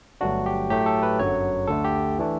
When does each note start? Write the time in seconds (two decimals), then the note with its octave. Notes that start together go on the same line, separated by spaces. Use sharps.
0.21 G1 G2 F#3 A3 D4 F#4
0.46 G4
0.70 A2 F#3 A3 G4
0.86 A4
1.03 B4
1.19 G1 F#2 D3 F#3 C#5
1.68 D2 D3 A3 A4
1.84 G4
2.19 E3 A3 D4